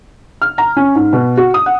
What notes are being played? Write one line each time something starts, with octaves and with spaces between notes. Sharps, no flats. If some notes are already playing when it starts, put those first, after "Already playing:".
F6
A#5
C#4
G#2
B2
F#4
D#6
F#5